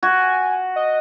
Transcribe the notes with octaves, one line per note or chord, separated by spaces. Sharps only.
F#4 G#5
D#5